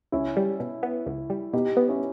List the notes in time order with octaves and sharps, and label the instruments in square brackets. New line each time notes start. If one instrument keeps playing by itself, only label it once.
[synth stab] C#2 [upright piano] C#4 E4
[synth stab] G3
B2
B3
C#2
G3
[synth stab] B2 [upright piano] D#4 G4
[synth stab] B3
[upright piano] C#4 E4